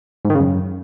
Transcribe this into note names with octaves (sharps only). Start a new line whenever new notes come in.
G#2
D#3
C#3
F#2